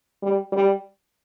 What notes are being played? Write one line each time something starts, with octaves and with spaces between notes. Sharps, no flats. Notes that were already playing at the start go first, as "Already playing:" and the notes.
G3
G3